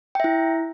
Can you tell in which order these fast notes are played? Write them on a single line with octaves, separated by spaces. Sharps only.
G5 E5 E4